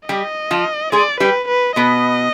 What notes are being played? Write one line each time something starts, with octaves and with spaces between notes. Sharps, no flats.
G3 G4 D#5
F3 F4
G#3 G#4 D5
G3 G4 B4
B4
B2 B3 D#5